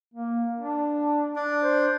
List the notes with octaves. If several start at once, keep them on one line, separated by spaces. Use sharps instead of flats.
A#3
D4
D4
C5